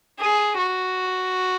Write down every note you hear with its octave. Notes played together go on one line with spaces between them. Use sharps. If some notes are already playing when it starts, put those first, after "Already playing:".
G#4
F#4